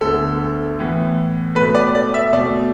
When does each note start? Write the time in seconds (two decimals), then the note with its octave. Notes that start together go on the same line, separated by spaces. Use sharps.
0.01 D2 D3 B3 A4
0.79 A2 E3 B3
1.55 B2 A3 B4
1.75 D5
1.95 D5
2.14 E5
2.33 B2 A3 D5